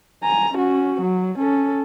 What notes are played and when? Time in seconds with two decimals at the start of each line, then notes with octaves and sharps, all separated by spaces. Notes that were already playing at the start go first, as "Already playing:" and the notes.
0.23 G#5 A#5
0.54 C#4 F#4
1.01 F#3
1.39 C#4 A4